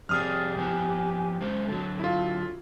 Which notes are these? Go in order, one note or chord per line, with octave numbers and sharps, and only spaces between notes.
F2 C3 G4 G#4 D5 D#6 F6
F3 B3 E4 G#5
G#3 C#4 A4 C5
D3 F#3 F#4 A4
E4 F4 A4